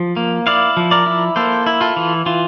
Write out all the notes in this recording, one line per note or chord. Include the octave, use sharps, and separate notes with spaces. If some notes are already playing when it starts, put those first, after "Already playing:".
Already playing: F3
A#3
E4 D5 F5
F3
A#4 D5
E4
A#3 A4 C5
E4
F4 A4
E3
E3 F4